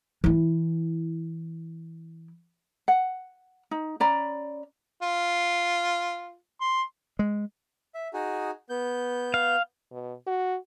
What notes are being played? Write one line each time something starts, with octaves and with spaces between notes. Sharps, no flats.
E3 E4
F#5
D#4
C#4 D5 A#5 B5
F4
C6
G#3
E5
D#4 F#4 G#4
B3 G6
F5
B2
F#4